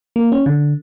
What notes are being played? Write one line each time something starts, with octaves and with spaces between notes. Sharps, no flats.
A#3
C#4
D3